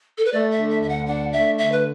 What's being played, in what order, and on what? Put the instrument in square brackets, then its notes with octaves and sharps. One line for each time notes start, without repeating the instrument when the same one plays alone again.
[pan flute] A4
B4
[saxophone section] A3 [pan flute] D5
[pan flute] E5
[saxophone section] D3
[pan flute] E5
[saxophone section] D2 [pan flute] E5
[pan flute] F#5
[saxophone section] D4 [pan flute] F#5
[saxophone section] A3 [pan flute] E5
[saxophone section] D3 [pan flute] E5
[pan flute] B4